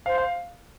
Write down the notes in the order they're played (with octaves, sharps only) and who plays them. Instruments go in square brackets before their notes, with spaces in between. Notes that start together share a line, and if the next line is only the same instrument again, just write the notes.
[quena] C5 [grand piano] F5
[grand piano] F5